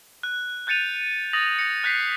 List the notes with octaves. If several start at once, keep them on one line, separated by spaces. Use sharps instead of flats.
F#6
F#6 G6 A6 C#7 D#7 F7
D#6 A6 A#6 F7 F#7
A#6 C#7
F#6 G6 B6 C7